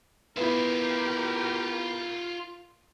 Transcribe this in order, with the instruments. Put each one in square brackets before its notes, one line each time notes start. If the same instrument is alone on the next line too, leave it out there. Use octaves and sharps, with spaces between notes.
[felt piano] B3 E4 [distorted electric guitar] F4 E5 [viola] G4 A#4